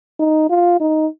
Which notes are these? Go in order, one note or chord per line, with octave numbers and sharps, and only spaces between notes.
D#4
F4
D#4